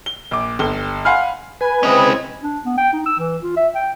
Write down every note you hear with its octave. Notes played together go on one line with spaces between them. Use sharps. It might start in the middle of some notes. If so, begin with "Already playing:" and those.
G7
A#1 D6
G1 G7
F5 F#5 G#5 B5 C6 F6
B4 G#5
G#3 C4 C#4 E4 D#5
D4
B3
G5
D#4
E6
E3
F4
E5
G5